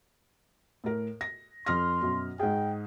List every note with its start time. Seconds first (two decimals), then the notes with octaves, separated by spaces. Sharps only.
0.84 A2 A#4
1.21 A#6
1.66 F2 C6 F6 A#6
2.01 F#2 B2
2.39 G#2 G#4 G5